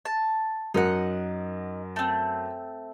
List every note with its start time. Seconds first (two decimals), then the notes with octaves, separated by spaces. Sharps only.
0.05 A5
0.74 F#2 D#4 A#4 F#5
1.96 A3 C4